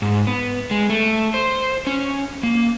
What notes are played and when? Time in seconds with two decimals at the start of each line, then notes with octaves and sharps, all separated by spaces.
0.02 G#2
0.27 B3
0.71 G#3
0.90 A3
1.34 C5
1.87 C#4
2.43 A#3